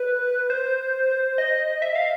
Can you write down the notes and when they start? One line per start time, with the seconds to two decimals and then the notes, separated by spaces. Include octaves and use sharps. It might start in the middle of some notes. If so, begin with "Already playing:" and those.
Already playing: B4
0.50 C5
1.38 D#5
1.82 E5
1.96 F5